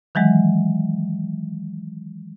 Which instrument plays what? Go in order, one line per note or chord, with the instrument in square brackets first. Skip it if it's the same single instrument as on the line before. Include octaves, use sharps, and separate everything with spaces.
[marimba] D#3 E3 F#3 G#3